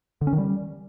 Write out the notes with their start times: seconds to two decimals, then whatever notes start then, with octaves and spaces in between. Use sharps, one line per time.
0.21 D3
0.27 C#4
0.33 D#3
0.38 G3